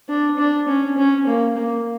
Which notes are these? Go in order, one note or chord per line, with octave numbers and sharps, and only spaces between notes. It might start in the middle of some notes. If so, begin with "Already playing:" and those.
D4
D4
C#4
C#4
A#3
A#3